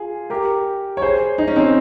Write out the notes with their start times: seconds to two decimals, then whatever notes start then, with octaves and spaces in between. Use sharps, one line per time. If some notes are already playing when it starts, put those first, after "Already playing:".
Already playing: F4 G#4
0.30 G4 A#4
0.97 C#5
1.02 G#4 C5
1.38 D#4
1.48 C#4
1.56 C4 D#4